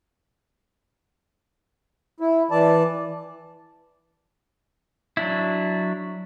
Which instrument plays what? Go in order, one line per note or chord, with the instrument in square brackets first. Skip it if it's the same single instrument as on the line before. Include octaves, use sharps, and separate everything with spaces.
[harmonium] E4
E3 D5 A5
[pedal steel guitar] F#3 D4 E4